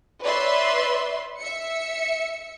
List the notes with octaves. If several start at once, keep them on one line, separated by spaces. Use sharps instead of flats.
B4 C#5 D5 E5 C6
E5 C#7